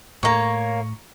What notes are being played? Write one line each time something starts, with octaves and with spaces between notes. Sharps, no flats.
A2 A#3 C#5 A#5 C#6